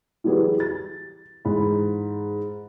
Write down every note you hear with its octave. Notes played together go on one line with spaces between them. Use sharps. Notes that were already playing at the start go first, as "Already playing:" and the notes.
E3 F#3 G3 G#4 B4
A6
G#2 E3 B5